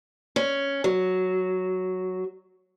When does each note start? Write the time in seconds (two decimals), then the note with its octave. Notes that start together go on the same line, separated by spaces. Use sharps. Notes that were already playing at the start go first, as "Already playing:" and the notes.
0.36 C#4
0.84 F#3